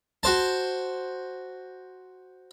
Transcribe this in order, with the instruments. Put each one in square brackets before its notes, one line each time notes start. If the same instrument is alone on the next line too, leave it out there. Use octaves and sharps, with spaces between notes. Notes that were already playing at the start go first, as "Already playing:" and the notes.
[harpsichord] F#4 C5 A5